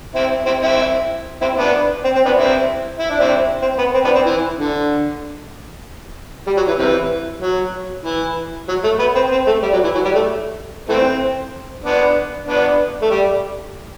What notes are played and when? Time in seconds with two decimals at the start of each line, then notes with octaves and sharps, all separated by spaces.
0.15 C4 E4
0.46 C4 E4
0.62 C4 E4
1.41 C4 E4
1.57 B3 D4
2.04 C4
2.15 C4
2.25 B3 D4
2.36 C4 E4
2.99 E4
3.10 D4
3.20 C4 E4
3.62 C4
3.78 B3
3.94 C4
4.05 B3 D4
4.15 C4
4.26 E3
4.57 D3
6.47 G3
6.57 F#3
6.68 E3
6.78 C3 E3
7.42 F#3
8.05 E3
8.68 F#3
8.84 A3
8.99 B3
9.15 C4
9.32 C4
9.47 A3
9.63 G3
9.73 F#3
9.84 E3
9.95 F#3
10.05 G3
10.15 A3
10.89 E3 A3 C4
11.84 B3 D4
12.47 B3 D4
13.02 A3
13.11 G3